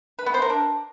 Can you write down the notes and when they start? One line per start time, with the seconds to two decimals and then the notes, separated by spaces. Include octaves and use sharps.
0.19 B4
0.26 B3
0.34 C5
0.42 A#4
0.50 D4